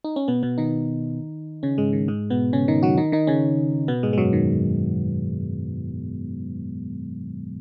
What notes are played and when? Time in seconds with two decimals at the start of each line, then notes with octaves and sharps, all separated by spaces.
0.04 D#4
0.16 C#4
0.28 B2 B3
0.43 B2 B3
0.58 D#3 D#4
1.63 C#3 C#4
1.78 G#2 G#3
1.93 D#3
2.08 G#2 G#3
2.30 B2 B3
2.53 C#3 C#4
2.68 D#3 D#4
2.83 F#3 F#4
2.97 D#3 D#4
3.12 D#3 D#4
3.27 C#3 C#4
3.88 B2 B3
4.03 G#2 G#3
4.13 G#3
4.18 F#2 F#3
4.33 D#3